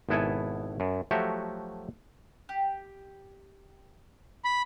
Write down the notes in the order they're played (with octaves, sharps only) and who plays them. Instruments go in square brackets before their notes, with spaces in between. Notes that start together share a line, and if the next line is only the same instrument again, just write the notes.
[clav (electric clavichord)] G#1 B2 B3 E4 A4 G#5
F#2
F3 F#3 A3 F#4 G4 E5
[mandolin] G4
[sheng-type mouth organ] B5